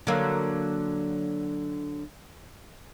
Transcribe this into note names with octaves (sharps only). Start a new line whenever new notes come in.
D3 F#3 A#3